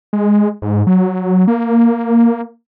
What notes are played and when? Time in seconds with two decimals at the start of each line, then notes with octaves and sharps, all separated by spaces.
0.13 G#3
0.62 G#2
0.87 F#3
1.47 A#3